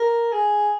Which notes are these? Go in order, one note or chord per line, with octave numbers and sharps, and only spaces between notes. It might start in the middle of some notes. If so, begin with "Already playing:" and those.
Already playing: A#4
G#4